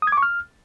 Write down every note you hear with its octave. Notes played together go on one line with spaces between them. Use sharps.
D#6
G#6
D6
C#6
F6